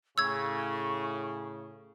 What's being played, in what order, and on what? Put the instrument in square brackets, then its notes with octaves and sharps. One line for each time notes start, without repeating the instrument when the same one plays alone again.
[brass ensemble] A2 C#3 [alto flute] C#6 [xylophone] E6 G#6